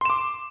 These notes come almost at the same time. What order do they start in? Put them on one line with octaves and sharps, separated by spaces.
C6 E7 D6